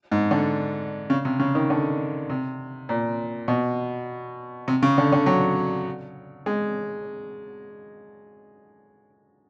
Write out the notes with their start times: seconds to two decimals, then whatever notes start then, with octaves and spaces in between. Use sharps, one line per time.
0.12 G#2
0.31 D3
1.10 C#3
1.25 C3
1.39 C#3
1.55 D#3
1.70 D3
2.30 C3
2.89 A#2
3.48 B2
4.68 C3
4.83 C#3
4.98 D3
5.12 D3
5.26 F#3
6.46 G#3